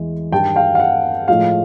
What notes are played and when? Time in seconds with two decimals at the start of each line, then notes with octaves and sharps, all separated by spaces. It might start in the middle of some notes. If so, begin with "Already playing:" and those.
Already playing: E2 E3 G#3
0.32 G2 D#3 G3 G5 A5
0.56 F5 G5
0.75 F5
0.80 F#5
1.28 A2 F3 G#3 F5